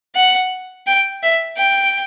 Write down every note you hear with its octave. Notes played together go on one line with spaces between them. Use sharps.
F#5
G5
E5
G5